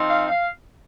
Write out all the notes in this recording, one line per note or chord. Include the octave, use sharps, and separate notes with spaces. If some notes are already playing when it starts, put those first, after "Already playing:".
Already playing: F3 C4 D#4
F5
F5